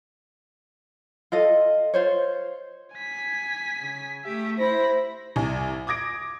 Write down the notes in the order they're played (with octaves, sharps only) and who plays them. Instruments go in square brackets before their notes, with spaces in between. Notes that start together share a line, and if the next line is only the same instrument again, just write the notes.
[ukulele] F4 A4 D#5
F4 C5 C#5
[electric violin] G#5 B6
[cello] C#3
[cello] A3 G4 [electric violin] E5
[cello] E4 [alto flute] C5 [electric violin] B5 A#6
[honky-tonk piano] C2 G#5
D6 D#6 G#6 A#6 D7